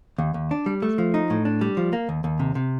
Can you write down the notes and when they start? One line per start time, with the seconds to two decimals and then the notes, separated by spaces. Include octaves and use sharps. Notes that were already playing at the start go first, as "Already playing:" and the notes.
0.18 D#2
0.34 D#2
0.51 D4
0.66 G3
0.82 A3
0.98 F3
1.14 D#4
1.30 A2
1.45 D4
1.61 G3
1.77 F3
1.93 A#3
2.09 D#2
2.24 D#2
2.40 C3
2.55 C3